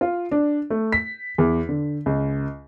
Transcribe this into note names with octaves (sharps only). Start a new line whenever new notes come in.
F4
D4
A3
B6
E2
D3
C#2